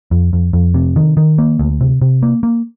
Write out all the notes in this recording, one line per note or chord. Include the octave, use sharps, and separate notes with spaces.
F2
F2
F2
C3
D#3
D#3
A#3
D2
C3
C3
A#3
A#3